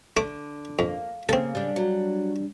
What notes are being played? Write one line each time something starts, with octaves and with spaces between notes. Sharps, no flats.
D3 A3 D6
F2 A#3
C#3 A#3 C4 A4
G3 D4
F#3